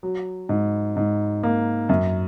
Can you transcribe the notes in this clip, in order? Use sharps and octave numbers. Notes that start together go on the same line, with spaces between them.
F#3
G#2
G#2
A#3
F#2